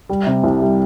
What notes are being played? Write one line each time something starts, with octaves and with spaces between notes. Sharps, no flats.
G3
C3
C2
G3